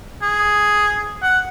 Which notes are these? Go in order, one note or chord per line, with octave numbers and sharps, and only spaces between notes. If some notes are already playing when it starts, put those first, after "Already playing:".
G#4
F#5